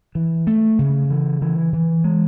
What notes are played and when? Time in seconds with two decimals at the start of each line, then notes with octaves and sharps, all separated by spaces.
0.15 E3
0.47 A3
0.79 C#3
1.11 E3
1.42 E3
1.73 E3
2.04 G#3